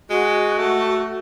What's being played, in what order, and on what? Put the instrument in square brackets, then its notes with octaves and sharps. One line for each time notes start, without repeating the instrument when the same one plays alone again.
[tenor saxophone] G#3 [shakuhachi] F#4
[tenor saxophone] A3